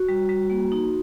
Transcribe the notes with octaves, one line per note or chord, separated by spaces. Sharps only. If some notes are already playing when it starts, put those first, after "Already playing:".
Already playing: F#4
G3
G3
A#3
D#4